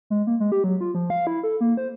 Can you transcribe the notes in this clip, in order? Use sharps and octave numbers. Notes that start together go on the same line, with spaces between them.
G#3
A#3
G#3
G4
F#3
F4
F3
F5
E4
A4
A#3
C5